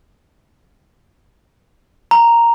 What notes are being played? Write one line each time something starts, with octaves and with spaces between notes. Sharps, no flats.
A#5